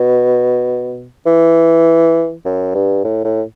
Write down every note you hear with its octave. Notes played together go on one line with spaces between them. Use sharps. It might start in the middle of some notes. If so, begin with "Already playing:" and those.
Already playing: B2
E3
F#2
G2
A2
A2